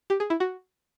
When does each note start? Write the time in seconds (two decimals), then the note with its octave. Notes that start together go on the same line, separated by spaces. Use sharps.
0.10 G4
0.20 G#4
0.30 E4
0.40 F#4